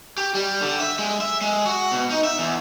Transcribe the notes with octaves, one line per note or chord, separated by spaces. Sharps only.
G4
G3
D3
E5
G#3
E5
G#3
F#4
B2
D#4
E5
E2